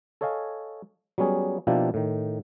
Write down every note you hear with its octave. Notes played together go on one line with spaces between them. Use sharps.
A4 C#5 D#5 F5 G#5
F#3 G3 B3 C#4 G#4
B2 F3 A#3 D4 E4 G4
A2 D#3